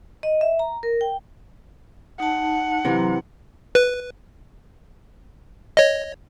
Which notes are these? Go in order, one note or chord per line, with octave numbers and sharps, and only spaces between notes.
D#5
E5
A#5
A#4
G5
D#4 F#5 A5
C3 E3 F#3 A#5 C6
B4
C#5 D#5